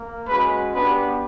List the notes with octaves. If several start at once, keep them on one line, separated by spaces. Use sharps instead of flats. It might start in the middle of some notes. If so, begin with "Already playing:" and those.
Already playing: A#3
G#3 C#4 F#4 B4
B3 D4 G4 B4